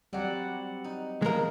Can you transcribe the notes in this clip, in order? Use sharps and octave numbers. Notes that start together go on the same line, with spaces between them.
F#3 G3 C4 D5 F#5
D#4
E2 F3 G#3 A#4 A#5